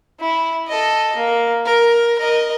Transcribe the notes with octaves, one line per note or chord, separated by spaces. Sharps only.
E4
A4 D#5
A#3
A#4
A#4 D#5